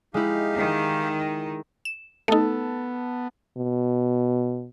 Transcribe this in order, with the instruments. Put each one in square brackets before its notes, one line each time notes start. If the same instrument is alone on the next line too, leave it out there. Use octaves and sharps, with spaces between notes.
[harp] G#3 E4 [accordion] D#4 G4 F5
[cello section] D#3
[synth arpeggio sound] E7
[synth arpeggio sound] A3 D#4 [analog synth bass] B3 [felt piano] A4 A5
[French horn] B2